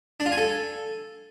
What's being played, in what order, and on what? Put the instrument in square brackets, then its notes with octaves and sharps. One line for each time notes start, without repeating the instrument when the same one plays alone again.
[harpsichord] D4
F4
G#5
A4